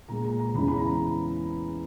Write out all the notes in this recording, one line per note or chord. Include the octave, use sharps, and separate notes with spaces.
A#2 G#3 A#5
A#5
A#5
E2 C#3 E3 G#3 B5
B5
A#5